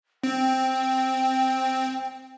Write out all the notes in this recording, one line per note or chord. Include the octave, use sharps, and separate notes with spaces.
C4 G5